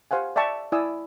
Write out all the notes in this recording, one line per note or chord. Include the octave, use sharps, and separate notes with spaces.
G4 C5 F5 F#5 G#5
D5 E5 G5 A5 C#6
E4 D5 G#5 D#6 E6